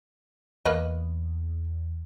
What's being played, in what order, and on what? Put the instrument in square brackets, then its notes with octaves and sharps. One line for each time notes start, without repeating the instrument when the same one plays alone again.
[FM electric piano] E2 [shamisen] A#3 B4 D#5